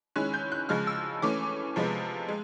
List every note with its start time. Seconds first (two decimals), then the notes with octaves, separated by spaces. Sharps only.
0.16 D#3 G#3 C#4 E4 F#6
0.34 G6
0.52 F#6
0.69 C#3 F3 G#3 F6
0.87 E6
1.22 E3 A3 C#4 D6
1.76 C3 F3 G#3 B3
2.28 G#3